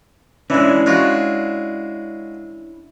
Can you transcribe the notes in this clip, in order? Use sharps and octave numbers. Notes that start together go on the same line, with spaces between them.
E3 G#3 C#4 D4 E4
G#3 F4 F#4